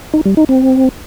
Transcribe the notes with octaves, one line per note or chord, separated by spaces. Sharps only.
D#4
G3
D#4
C4